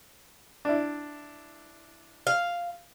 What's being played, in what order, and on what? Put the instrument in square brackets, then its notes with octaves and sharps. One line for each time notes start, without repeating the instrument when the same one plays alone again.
[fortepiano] D4 E4
[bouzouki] F5